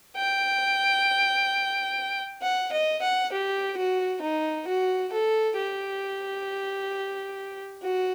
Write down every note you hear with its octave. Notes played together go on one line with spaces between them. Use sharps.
G5
F#5
D#5
F#5
G4
F#4
D#4
F#4
A4
G4
F#4